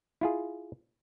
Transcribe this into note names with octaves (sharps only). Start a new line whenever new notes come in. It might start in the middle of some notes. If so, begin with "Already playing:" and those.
E4 F4 G#4